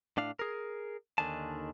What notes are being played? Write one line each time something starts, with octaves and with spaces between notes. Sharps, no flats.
A2 D4 F5
G#4 A#4
D#2 D3 D#3 D4 G#5 A5